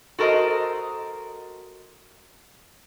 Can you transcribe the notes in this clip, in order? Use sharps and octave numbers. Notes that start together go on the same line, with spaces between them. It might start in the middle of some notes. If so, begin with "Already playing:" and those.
F#4 A4 A#4 C5 D#5